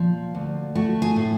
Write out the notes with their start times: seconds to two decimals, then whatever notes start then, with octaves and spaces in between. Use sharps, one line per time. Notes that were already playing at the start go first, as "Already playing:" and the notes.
Already playing: A#2 F3
0.35 D2
0.75 A3 F#4
1.02 G#4
1.16 A2